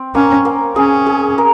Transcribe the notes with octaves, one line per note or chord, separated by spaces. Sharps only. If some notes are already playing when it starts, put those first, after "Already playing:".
Already playing: C4
A#3 C#4
A#3
C#4 G#4
G#4
A#4